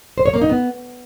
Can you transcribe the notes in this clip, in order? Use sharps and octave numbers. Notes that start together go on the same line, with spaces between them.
C5
C#5
A#3
D#4
B3